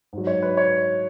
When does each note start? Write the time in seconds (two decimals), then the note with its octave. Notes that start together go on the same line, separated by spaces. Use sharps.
0.13 G#2 F#3
0.27 C#5
0.43 B4
0.57 C#5